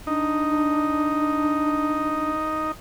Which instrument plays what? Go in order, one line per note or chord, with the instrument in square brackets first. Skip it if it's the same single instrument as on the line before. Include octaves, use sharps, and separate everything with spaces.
[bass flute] D4 [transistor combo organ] D#4